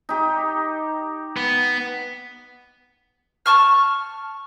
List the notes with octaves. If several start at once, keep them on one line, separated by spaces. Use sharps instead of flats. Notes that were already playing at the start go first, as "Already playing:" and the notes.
D#4 G4
B3
A5 C#6 F6